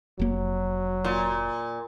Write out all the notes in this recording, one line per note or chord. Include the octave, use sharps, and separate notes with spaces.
F1 F#3 A#3
A#2